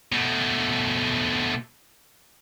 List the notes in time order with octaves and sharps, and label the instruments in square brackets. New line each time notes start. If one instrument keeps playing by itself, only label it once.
[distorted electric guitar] B2 A3